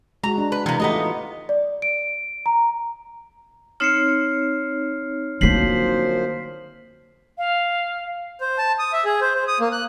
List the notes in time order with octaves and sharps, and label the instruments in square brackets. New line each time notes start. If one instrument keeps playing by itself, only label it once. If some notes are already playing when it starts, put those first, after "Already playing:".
[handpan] G#3 F#4 [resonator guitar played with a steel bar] A#5
[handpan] D4
[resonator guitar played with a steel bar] B4
[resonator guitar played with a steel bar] C3 A#3 [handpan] E3
[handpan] A3 G4 [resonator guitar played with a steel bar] B3 D#4 D#5
[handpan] F4
[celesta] D5
D7
A#5
[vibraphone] C4 D#4 C#5 [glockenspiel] F6 C7 C#7
[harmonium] F#2 F3 C5 [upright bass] D3 A#3 [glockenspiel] B6 C7 F#7
[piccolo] F5
[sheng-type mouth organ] C5
A5
D#6
E5
G#4
C5
C5
D#6
A#3
F#6